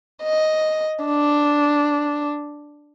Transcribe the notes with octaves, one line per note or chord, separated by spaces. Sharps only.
D#5
D4